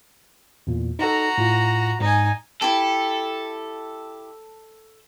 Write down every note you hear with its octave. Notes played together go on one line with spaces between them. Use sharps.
E2 A#2
D#4 F#4 A4 A#5
A2 F4
G#2 D#4 G#5
E4 G4 A4